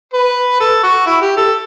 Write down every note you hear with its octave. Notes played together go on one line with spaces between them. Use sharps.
B4
A4
F#4
E4
G4
A4